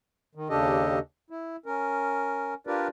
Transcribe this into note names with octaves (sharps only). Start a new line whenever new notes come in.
D#3
D#2 C#3 D4 G4 A4 D#5
E4
C#4 A#4
D4 F4 G4 A#4 B4 D5